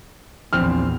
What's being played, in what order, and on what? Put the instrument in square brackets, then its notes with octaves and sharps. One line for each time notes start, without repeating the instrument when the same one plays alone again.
[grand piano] A#1 C4 F6 [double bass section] E2 A#2